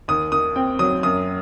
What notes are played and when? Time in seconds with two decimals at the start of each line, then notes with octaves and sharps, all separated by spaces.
0.08 D#2 D#6
0.32 D#3 D#6
0.56 C4 G5
0.79 F#3 D#6
1.03 F#2 D#6